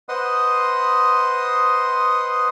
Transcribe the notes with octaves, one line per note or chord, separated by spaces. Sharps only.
B4 C5 D#5 F#5 C6 D#6